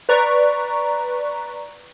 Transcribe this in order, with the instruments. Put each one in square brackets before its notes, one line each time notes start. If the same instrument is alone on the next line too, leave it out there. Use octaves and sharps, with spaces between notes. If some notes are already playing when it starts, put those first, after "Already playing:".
[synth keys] B4 D5 A#5 C#6